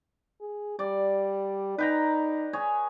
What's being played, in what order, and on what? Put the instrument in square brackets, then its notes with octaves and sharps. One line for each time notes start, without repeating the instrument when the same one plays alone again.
[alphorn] G#4
[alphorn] G3 [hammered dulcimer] D5
[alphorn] D#4 [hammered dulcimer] B4 G5 A#5
[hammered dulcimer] G#4 C#5